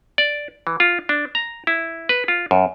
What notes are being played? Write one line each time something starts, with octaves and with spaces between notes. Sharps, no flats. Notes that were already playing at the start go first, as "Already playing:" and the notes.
D5
E3
F4
D4
A#5
E4
B4
F4
F#2